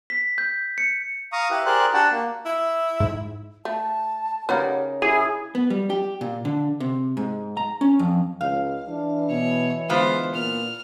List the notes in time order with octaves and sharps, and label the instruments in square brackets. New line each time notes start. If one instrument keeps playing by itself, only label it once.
[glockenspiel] B6
G6
C#7
[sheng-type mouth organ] F5 A#5 C#6 D#6
E4 G4 B4
G4 G#4 A#4 C5 D5 F#6
D4 F#4 G4 F#5 G5 A5
A#3
[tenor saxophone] E4
[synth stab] G#2
[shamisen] A3 [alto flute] A5
[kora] C#3 D#4 A#4 [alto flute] G4 [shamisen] B4 D5 F#5
[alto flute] E4 [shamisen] G4 [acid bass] G#4
[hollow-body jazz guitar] B3
G3
G4
A#2
D3
C3
G#2
A#5
C#4
F2
[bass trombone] C#2 [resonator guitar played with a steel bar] F5
[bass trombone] E3 [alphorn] D4
[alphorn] B2 [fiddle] C#5
[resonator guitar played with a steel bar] D3 B3 F4 [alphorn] G#3 [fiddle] C5
[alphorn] A#2 [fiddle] F6